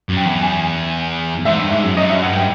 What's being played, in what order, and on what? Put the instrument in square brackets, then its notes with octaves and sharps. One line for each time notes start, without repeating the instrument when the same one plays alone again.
[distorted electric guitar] F#2
[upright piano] G5
[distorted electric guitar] E2
[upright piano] G#5
[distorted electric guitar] G#2 [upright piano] E5
[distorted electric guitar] G2
[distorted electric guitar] G#2 [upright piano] E5
[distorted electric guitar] F#2
[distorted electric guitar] F#2 [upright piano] D#5
[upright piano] E5
[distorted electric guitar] G2 [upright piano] F#5
[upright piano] G5